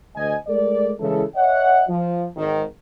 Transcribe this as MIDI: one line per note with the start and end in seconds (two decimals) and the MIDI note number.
0.15 0.35 38
0.15 0.35 75
0.15 0.35 80
0.47 0.93 56
0.47 0.93 57
0.47 0.93 70
0.47 0.93 74
1.00 1.22 49
1.00 1.22 52
1.00 1.22 56
1.00 1.22 64
1.00 1.22 69
1.35 1.83 73
1.35 1.83 75
1.35 1.83 76
1.35 1.83 78
1.88 2.25 53
2.36 2.63 32
2.36 2.63 51